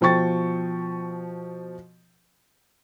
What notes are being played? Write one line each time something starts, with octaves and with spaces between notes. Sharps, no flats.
B2 F3 G5 C#6 A6